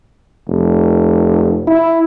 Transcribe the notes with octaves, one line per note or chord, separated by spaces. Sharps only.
F1
E4